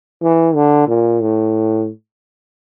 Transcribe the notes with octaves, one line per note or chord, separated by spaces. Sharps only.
E3
D3
A#2
A2